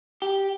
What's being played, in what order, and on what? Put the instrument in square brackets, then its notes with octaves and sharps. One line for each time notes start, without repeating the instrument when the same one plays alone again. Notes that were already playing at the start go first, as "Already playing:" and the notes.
[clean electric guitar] G4